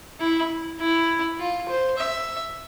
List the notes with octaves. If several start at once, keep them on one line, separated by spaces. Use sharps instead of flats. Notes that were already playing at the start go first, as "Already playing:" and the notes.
E4
E4
F4
C5
E5